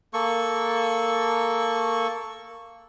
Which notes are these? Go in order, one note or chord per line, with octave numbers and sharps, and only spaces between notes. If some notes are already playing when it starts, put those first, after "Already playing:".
A#3 A4 C#6